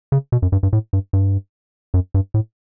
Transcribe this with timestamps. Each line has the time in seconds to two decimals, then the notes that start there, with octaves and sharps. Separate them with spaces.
0.12 C#3
0.32 B2
0.42 F#2
0.52 G2
0.63 G2
0.73 A2
0.93 G2
1.13 G2
1.94 F#2
2.14 G2
2.34 A2